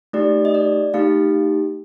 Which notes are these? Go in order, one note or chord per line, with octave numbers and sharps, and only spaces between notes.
A3 D#4 G4 D5
D#5
D5
A3 D#4 G4 F5